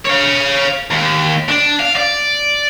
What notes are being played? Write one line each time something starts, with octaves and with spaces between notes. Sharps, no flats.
C#5 F5
D#2
D4
F5
D5